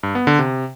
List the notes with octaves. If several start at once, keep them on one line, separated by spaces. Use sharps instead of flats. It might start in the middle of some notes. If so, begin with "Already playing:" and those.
G2
B3
D3
C3